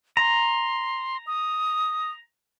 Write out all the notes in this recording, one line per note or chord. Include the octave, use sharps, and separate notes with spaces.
A#5 C6
D#6